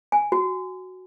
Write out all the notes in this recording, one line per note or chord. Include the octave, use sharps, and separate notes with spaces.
G#5
F#4